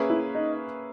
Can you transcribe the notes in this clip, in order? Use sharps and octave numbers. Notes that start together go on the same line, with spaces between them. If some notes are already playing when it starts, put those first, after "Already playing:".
Already playing: A#3 C#4 G#4 B4 E5
E4
D#4